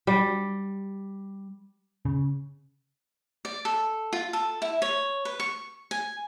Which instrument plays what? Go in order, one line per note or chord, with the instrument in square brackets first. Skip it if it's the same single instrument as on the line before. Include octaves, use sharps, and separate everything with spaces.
[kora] G3
[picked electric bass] C#3
[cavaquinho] D5
A4
F4
A4
E4
C#5
B4
C#6
G#5